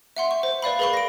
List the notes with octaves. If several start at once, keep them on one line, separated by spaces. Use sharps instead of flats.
E5 F#5 C6
C#6
C5
B4 D5 F5 B5
G#4 A#4 B4 F5 B5 C#6
A#6 D7